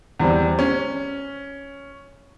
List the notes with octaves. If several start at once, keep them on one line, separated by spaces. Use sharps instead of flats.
E2 G3 C4
C#4